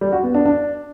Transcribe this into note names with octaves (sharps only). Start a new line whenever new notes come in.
G3
F#4
B3
D4
D4